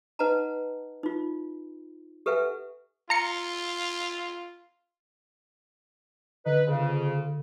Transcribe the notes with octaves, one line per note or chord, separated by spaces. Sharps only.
D#4 B4 D#5 F#5 A5 A#5
D#4 F4
G4 A4 B4 E5 F#5 G#5
F4 A#5 C#7
D3 D#4 B4
F2 C#3